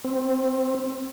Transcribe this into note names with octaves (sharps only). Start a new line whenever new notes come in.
C4